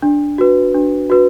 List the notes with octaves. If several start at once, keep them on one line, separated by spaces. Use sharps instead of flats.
D4
F#4 B4
D4
F#4 B4